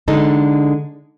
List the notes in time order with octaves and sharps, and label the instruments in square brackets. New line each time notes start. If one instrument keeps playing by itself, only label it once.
[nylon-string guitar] D3 G#3 D4 D#4 A4